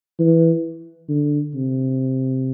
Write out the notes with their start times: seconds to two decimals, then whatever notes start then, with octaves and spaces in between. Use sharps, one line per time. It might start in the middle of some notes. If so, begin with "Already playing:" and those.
0.19 E3
1.09 D3
1.55 C3